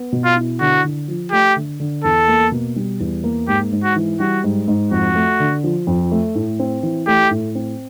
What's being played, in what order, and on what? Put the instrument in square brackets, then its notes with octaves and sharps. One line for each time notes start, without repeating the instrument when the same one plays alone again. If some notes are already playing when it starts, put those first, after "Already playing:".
Already playing: [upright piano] B3
B2
[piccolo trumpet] F4
[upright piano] E4
[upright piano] D3 [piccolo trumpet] F#4
[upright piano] D3
F3
[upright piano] A3 [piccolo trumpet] G4
[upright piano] D3
D3
[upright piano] E2 [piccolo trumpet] A4
[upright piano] A#3
B2
G3
E2
A#3
[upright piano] G#2 [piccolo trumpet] G4
[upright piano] G#2
[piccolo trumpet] F#4
[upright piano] E3
[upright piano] G3 [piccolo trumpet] F#4
[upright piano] G#2
G#2
[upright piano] F2 [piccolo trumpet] F#4
[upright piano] A3
D3
F3
F2
A3
A2
C4
E3
[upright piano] A3 [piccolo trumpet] G4
[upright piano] A2
C4